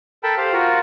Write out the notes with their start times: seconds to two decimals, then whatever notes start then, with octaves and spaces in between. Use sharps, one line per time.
0.23 A4 A#4 G5 A5 B5
0.37 G4 C5 F5
0.53 F4 F#4 A#4